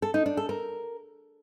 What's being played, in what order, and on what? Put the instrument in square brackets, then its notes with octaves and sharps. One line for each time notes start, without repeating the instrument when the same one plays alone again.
[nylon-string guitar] A4
D#4
D4
A4
A#4